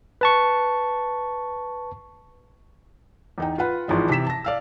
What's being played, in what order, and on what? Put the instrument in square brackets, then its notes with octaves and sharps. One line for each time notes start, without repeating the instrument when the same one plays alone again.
[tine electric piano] B4 A5 C#6
[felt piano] E2 D#4 G5
F4 B4 F#5 B5
G#1 E3 F3 G#3
C3 E3 B6 E7
A5 A#6
D5 F5 E6